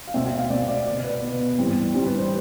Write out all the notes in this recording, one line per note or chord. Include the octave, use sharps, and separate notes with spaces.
F5
B2 A3 C4 E5
E5
F5
B2 A3 C4 D5
D5
B2 B3 D5
B4
B2 B3
A2 E3 G3 C4
A2 E3 G3 C4 G4
B4
C5